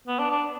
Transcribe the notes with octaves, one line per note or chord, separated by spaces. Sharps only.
B3
D4
D4